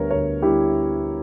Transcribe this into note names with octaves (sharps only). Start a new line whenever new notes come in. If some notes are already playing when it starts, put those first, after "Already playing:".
Already playing: D2 D3 G3 B3 A#4 C#5
D2 A#4 C#5
D3 G3 B3 E4 G4